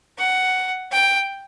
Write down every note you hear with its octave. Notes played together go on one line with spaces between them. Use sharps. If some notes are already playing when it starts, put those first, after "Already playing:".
F#5
G5